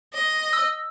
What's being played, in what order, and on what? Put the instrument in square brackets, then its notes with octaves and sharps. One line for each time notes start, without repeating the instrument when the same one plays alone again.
[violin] D#5
[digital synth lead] E6